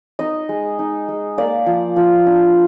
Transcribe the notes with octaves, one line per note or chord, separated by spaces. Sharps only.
D#4 D#5
G#3
D#4
G#3
A#3 D5
F3
F3
D4